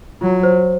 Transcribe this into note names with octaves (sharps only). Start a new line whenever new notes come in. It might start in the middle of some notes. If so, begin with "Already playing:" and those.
F#3 F4
C5